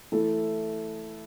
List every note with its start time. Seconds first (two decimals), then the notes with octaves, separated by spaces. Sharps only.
0.12 E3 A3 E4 A4